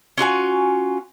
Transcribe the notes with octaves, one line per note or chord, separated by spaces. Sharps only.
C#4 F4 F#4 G#5